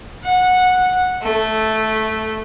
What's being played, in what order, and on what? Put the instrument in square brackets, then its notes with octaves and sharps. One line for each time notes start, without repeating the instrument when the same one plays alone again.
[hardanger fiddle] F#5
A3